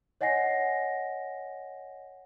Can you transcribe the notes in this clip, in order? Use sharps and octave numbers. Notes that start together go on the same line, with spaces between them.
C#5 D#5 F#5 G#5 A#6 C7